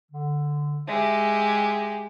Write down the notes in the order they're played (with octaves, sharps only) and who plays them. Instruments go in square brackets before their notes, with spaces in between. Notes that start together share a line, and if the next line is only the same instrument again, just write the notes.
[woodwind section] D3
[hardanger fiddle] G#3 G4 [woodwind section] E5